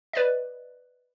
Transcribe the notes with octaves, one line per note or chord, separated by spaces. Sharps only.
B4 D5 D#5